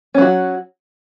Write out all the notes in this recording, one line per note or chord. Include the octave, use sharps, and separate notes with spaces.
F#3 C#4 F#4